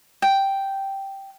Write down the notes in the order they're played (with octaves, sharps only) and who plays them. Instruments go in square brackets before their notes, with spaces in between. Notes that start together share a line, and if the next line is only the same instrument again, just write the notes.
[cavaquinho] G5